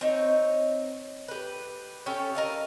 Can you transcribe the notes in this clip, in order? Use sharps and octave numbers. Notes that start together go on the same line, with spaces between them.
C4 D#4 C#5
G4 B4
C#4 G4 A4 C#5
A#4 D#5 F5